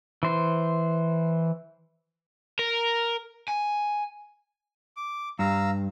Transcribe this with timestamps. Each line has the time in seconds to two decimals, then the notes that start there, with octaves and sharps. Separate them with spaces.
0.23 E3 C5
2.59 A#4
3.48 G#5
4.97 D6
5.39 G2 F5 A#5 E6